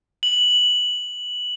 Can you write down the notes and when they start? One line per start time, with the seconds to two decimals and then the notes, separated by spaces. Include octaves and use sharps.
0.23 F#7